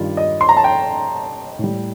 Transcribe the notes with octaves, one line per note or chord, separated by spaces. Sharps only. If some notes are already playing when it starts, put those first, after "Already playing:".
Already playing: G2 D#3 G3 F4
D#5
C6
A#5
A5
G5
A2 G3